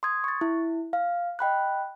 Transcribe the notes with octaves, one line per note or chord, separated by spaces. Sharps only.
C6 D#6 G#6
C#6 A6
E4
F5
D#5 G5 B5 F#6